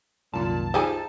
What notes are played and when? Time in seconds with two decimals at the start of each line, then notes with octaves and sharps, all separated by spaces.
0.34 C2 F#2 A#2 D#3 A5
0.74 F3 D#4 G#4 F5 G#5 E6